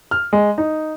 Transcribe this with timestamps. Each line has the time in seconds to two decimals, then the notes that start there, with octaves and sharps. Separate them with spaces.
0.11 F6
0.33 G#3
0.58 D#4